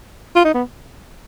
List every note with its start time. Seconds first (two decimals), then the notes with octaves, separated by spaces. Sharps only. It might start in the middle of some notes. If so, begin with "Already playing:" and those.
0.35 F4
0.45 D#4
0.54 B3